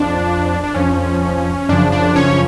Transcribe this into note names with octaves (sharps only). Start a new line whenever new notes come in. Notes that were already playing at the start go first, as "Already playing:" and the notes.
Already playing: F2 F3 D4
D4
F2 F3 C#4
F#2 C#3 F3 D4
D4
C#4 C#5